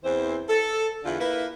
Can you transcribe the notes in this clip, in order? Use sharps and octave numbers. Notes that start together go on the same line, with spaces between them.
E2 E3 C4 C5
A4
E2 D3 E4 F4
A#3 E4 B4